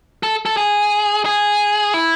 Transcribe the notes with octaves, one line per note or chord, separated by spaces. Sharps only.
A4
A4
G#4
G#4
E4